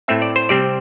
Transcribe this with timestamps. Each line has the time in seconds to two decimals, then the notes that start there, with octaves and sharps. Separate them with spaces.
0.08 A2 A3 C4 E5
0.22 D5
0.36 C5
0.49 C3 G3 C4 D5